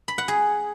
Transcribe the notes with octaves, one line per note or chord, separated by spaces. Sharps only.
B5
F#5
G#4